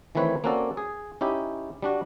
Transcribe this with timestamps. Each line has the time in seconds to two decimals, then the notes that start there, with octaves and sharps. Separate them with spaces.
0.15 D#3 E3 A3 C4 B4 C#5
0.44 A#3 C4 C#4 F#4 A4 D5
0.77 G#4
1.21 C#4 D#4 E4 G4
1.82 G3 D4 F#4